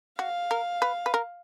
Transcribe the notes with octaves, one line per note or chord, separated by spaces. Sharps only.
F#4 F5
A#4
B4
B4
A#4